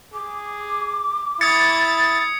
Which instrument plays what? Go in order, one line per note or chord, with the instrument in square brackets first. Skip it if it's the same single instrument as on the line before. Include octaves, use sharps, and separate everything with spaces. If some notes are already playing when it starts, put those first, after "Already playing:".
[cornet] G#4 [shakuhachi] D6
[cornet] E4 [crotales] D#6 G#6 C#7 [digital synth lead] A6